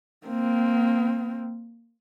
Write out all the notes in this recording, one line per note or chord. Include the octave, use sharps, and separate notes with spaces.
A#3 C4